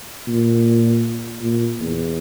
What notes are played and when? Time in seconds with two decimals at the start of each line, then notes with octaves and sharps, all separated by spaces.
0.27 A#2
1.41 A#2
1.80 E2